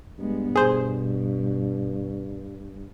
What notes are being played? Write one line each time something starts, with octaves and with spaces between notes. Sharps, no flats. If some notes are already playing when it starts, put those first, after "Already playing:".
G2 G#3 B3
B2 G#4 C5